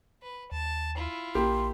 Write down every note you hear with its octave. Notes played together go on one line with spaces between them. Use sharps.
B4
D#2 A5
E4 F4
A#1 A#3 G4 C6